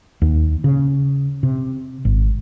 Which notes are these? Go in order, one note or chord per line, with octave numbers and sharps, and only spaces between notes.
D#2
C#3
C3
G#1